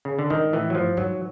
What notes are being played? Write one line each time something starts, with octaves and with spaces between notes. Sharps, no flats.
C#3
D3
G#2 D#3
A2 E3
F#3
G2 F3
G#2 F#3